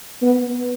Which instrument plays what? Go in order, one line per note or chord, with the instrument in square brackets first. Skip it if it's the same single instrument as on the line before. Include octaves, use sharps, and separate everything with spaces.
[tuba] B3